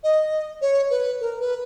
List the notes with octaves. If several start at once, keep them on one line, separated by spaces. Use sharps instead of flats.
D#5
C#5
B4
A#4
B4